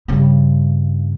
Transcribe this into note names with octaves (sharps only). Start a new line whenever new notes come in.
G2 C#3